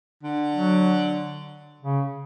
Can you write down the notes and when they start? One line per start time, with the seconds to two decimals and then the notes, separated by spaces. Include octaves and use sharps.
0.23 D3
0.54 F#3
1.82 C#3